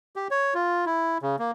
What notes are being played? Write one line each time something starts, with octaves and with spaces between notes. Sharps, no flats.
G4
C#5
F4
E4
C#3
A#3